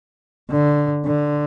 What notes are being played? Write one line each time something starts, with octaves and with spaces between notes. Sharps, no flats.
D3
D3